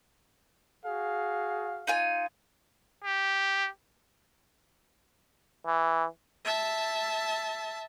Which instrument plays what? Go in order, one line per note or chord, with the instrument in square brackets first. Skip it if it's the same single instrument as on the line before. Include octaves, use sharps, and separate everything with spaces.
[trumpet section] F#4 G#4 F5
[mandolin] D#4 F4 G#5
[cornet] G4
[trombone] E3
[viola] E5 A5